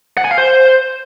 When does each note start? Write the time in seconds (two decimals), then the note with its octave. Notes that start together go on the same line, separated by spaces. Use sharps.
0.17 F#5
0.24 G#5
0.31 F5
0.38 C5